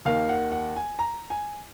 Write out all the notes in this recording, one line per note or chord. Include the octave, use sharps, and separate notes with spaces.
D#2 D#3 A#3 F5
F#5
F#5
G#5
A#5
G#5